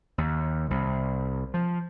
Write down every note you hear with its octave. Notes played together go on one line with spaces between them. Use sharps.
D#2
C2
F3